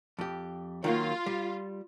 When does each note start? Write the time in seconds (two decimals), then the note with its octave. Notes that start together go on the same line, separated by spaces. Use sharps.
0.19 F2 G4
0.84 D#3 F#3 A#3 F4
1.26 G3